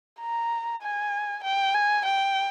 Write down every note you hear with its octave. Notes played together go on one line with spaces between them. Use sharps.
A#5
G#5
G5
G#5
G5